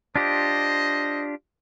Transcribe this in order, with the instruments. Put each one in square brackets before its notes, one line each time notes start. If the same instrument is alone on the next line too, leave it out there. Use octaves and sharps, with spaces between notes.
[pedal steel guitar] D4 F4 G4 [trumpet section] C5 D#5